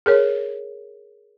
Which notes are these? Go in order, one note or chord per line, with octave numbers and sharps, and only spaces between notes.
G#4 A#4 C#5